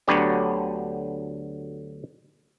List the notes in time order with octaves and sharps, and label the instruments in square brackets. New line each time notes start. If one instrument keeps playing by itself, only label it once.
[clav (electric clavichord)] D2 D3 F#3 B3 G4 C#5